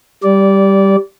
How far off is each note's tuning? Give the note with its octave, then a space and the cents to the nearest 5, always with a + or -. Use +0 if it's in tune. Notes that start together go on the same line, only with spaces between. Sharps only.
G3 +0 D5 -15